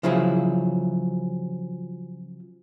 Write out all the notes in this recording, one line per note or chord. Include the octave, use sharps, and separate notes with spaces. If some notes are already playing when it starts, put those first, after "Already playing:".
C#3 F3 F#3 E4 G#4